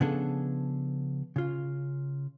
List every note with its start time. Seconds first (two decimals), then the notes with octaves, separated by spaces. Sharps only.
0.01 C#3 F3 B3 D4 G#4 A4
1.36 C#3 F4